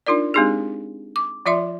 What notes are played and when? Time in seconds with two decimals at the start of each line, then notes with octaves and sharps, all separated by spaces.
0.07 D4 D#4 F4 A#4 D5
0.34 G#3 C4 D4 D#4 G4 G#4
1.16 D6
1.46 F3 F4 D5 E5 C6